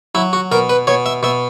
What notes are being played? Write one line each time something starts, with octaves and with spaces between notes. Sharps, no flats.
F#3 E4
F#4
B2 A#4
B4
B2 C#5
E5
B2 E5